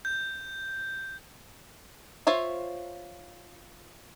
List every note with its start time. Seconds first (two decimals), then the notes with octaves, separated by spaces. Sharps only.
0.05 G6
2.27 F4 C5 C#5 E5